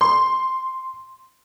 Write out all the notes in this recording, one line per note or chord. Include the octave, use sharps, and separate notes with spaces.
C6